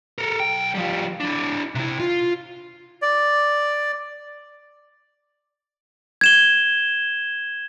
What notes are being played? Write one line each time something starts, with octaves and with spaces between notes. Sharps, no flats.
A4 A#4
B1 G5
F3 G3
D4 E4
C3 E4
F4
D5
G#6 E7 G7